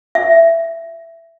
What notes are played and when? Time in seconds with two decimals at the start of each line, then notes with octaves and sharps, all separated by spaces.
0.15 E5